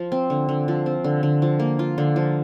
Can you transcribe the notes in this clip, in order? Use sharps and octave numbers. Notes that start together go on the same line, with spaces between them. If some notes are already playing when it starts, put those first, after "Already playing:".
Already playing: F3
C4
D3
D3
F3
C4
D3
D3
F3
A#3
F4
D3
F3